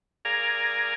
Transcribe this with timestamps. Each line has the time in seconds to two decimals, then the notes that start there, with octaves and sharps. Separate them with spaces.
0.25 G#4 A#4 D5 F5 G#5 A#5